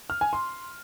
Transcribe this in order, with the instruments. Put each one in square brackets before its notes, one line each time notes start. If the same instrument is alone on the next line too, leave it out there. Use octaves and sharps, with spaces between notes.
[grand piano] F6
G#5
C6